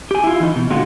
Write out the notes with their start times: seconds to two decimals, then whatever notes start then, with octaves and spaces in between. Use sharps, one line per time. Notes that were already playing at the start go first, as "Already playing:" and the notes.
0.11 G4 G#5
0.24 E4 F4
0.40 E3 D#4
0.56 B2
0.70 A#2 D3 G#3 F4 F#4